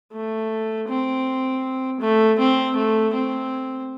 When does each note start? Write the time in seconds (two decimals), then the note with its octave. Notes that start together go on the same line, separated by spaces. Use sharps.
0.12 A3
0.88 C4
2.01 A3
2.39 C4
2.76 A3
3.14 C4